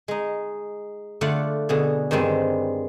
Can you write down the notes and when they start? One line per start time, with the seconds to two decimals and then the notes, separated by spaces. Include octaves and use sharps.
0.08 G#3 D#4
1.21 D3 A3 F4 D5 F#5
1.69 B2 D3 G#4
2.11 G2 D#3 G3 G#3 C4